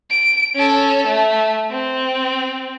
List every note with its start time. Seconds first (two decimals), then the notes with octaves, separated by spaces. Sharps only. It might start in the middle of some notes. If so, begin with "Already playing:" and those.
0.10 D7
0.55 C#4 A4
1.07 A3
1.70 C4